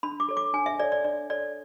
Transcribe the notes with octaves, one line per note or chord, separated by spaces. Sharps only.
D4 B5
D6
A4 C#5
D6
D4 G#5
E5
A4 C#5 D5
D5
D4 D5
A4 C#5 D5